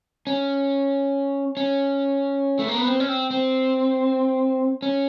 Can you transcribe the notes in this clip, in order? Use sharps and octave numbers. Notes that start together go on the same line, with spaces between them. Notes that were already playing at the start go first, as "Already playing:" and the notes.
C#4
C#4
A3
A#3
B3
C4
C#4
C4
C4
C#4